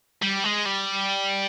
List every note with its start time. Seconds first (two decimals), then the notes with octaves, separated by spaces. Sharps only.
0.22 G3
0.44 G#3
0.66 G3